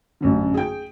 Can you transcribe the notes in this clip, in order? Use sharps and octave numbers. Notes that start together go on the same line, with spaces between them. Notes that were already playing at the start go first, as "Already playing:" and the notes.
A1 F#2 D3
G#4 G5